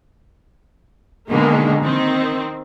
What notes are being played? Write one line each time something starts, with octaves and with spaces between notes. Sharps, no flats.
B2 D3 D#3 G#3 A#3
D#3 C4